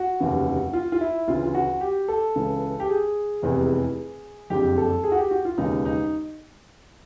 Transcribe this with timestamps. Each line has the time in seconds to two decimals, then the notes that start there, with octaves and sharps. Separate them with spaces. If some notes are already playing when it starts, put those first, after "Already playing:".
Already playing: F#4
0.20 F1 D#2 C#3 E3
0.73 F4
0.92 F4
1.01 E4
1.28 D2 C#3 E3 F4
1.44 F4
1.54 F#4
1.81 G4
2.08 A4
2.36 C#2 C#3 E3
2.80 G4
2.89 G#4
3.42 F1 E2 C3 E3
4.50 F#1 F2 D3 G4
4.77 A4
5.04 G#4
5.12 F#4
5.18 G4
5.31 F#4
5.45 F4
5.58 E1 D#2 C#3 E3 D#4
5.85 D#4